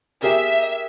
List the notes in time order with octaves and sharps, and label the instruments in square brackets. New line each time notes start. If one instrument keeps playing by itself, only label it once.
[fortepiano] G4 G#4 A#4 [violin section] E5